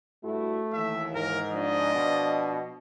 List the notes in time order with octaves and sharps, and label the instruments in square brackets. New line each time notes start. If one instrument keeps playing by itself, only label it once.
[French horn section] G2 E4 F#4 [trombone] A3
[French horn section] D#2 E3 [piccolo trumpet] E5
[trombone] G#2 [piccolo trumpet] A#4
[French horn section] F3 D4 [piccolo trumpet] D#5
[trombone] B2